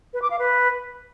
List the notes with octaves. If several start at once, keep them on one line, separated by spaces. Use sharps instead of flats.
B4
D6
F5
B4